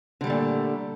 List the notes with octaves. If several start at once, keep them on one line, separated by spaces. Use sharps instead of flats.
A#2 D3 G3 A3